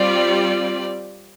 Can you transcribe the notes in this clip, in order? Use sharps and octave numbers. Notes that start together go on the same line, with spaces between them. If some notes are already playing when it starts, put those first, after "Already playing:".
Already playing: G3 C4 F4 D5